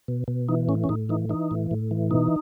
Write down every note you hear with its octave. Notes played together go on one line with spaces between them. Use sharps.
B2
B2
E3 D#4
A2 C#4
C#4
A2 D#4
E3 D#4
E3 D#4
A2
A2
E3
B2 D#4